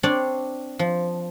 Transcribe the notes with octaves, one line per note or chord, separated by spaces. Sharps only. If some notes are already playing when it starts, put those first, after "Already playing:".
C4 D4 C#5 D5
F3